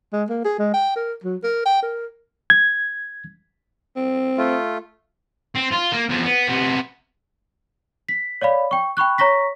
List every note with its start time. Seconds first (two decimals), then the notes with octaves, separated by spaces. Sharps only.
0.13 G#3
0.29 A#3
0.45 G#4
0.59 G#3
0.74 G5
0.96 A#4
1.24 F#3
1.44 A#4
1.66 G5
1.82 A#4
2.50 G#6
3.96 C4
4.38 A3 F4
5.56 C4
5.73 F4
5.93 A#3
6.09 E2 F3
6.24 B3
6.48 C3 B3
8.09 B6
8.41 C#5 D5 F5 B5
8.71 G5 C#6
8.97 G5 B5 C#6 F#6
9.18 C#5 A#5 C#6 A#6 B6